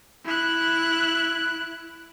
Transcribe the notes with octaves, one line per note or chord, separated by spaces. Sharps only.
E4 F#6